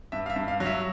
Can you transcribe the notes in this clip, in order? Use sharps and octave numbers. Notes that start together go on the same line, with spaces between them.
G2 E5
F5
E5
G2
F5
F#3
E5